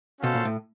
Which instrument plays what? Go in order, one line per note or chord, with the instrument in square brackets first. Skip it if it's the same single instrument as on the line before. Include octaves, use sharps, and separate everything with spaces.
[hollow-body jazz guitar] B2 [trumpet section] C#4 F#4 A4 C5 F5
[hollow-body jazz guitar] A#2
A2